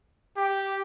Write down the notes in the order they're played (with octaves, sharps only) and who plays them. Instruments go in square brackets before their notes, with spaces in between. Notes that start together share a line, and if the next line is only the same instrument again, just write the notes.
[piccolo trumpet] G4